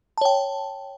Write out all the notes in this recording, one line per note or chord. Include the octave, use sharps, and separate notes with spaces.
C#5 G5 A5